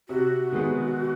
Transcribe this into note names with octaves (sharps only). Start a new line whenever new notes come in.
C3 F#4
D#3 G#3 B3